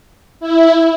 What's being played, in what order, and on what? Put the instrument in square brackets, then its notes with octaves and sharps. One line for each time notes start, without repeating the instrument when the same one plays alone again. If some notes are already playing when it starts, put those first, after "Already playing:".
[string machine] E4